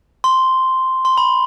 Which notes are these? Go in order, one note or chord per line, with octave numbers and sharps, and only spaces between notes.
C6
C6
B5